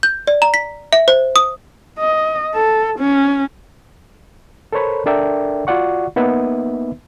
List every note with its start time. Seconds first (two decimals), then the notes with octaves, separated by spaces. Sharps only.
0.03 G6
0.27 D5
0.42 A#5
0.54 B6
0.93 E5
1.08 C5
1.36 D#6
1.99 D#5
2.55 A4
2.99 C#4
4.73 A4 A#4 C5 C#5 B5
5.06 D4 A4 A#4 D5 E5 G5
5.67 F4 F#4 D5 F#5 C#6
6.16 A#3 B3 D#4 B4 E5